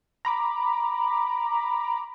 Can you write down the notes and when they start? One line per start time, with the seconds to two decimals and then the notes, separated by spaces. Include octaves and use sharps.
0.25 A#5 B5 D6